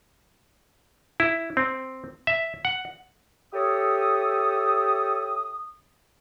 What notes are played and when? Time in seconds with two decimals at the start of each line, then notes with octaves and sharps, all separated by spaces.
1.20 E4
1.57 C4
2.27 E5
2.65 F#5
3.54 G4 A4 C#5 E5 D#6